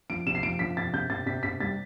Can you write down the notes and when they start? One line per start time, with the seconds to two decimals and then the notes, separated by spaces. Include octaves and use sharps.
0.10 F3 D7
0.26 C3 E7
0.35 C7
0.43 F3 D7
0.59 F3 B6
0.77 C3 A6
0.93 C3 G6
1.09 C3 A6
1.26 C3 B6
1.43 C3 B6
1.60 G3 A6